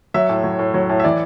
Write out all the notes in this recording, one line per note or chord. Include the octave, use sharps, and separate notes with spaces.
F#3 E5
A2
F#3
A2
F#3
A2
E5
E3 D5